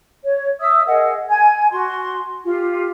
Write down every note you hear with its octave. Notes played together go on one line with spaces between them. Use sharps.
C#5
E5 D#6 E6
G#4 A#4 D#5 F#5
G#5 G#6
F#4 C6
F4 G4